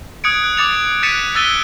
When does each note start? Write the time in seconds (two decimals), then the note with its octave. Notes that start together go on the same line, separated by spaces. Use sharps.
0.24 D#6 F#6 G#6 C#7 D7
0.44 F#6
0.57 D6 D#6 A6 C#7 F7
1.03 F#6 A6 B6 C#7 D#7 E7
1.35 E6 F#6 A6 B6 D#7 G7